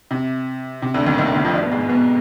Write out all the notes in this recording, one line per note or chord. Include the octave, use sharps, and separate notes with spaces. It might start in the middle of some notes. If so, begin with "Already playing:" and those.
C3
C3
D2 D3
D#2 D#3
D#2 D#3
D2 D3
D#2 D#3
F2 F3
G2 G3
B2 B3
G#2 G#3
B2 B3